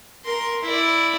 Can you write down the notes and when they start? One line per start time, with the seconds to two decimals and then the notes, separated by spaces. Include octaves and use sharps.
0.25 A#4 C6
0.62 E4 D5